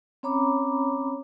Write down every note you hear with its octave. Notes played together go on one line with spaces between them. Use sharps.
C4 C#4 C#5 A#5 B5 D6